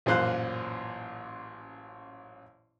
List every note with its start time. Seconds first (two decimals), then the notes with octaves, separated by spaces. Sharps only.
0.06 A1 F#2 A#2 C5 F5 F#6